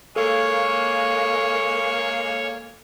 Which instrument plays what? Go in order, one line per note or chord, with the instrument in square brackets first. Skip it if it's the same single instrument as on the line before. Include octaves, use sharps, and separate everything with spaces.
[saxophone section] G#3 A#3 [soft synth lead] A4 [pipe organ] C#5